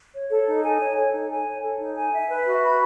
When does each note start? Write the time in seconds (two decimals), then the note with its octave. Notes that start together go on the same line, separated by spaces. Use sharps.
0.14 C#5
0.30 A4
0.47 D#4
0.62 G#5
0.79 C#5
0.96 A4
1.13 D#4
1.29 G#5
1.46 C#5
1.62 A4
1.79 D#4
1.96 G#5
2.12 E5
2.29 B4
2.46 F#4
2.62 B5